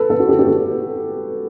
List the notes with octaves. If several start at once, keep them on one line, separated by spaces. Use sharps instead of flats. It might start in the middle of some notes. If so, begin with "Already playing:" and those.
Already playing: A4 B4
A4
F#4
G4
G4
A4